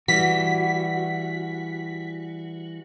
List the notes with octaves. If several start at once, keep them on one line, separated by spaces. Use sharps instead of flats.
E3 G3 F#4 B6